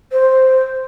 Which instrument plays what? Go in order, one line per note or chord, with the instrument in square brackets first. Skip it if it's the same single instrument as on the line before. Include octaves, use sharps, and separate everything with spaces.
[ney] C5